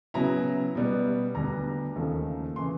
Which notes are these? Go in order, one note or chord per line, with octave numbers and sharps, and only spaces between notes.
C#3 F#3 B3 E4 A#5
B2 G3 B3
D2 D3 G3 B3 A#5
D#2 C#3 F3 A3
C#3 E3 C6